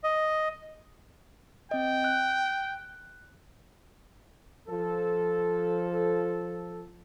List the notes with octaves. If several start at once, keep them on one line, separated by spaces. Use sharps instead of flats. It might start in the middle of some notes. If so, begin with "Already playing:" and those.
D#5
C4 D#5 G5
F#6
F3 A4